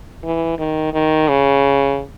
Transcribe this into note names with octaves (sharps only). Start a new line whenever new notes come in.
E3
D#3
D#3
C#3